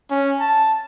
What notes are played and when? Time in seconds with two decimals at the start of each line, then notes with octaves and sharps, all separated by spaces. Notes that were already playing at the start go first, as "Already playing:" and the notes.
0.10 C#4
0.40 A5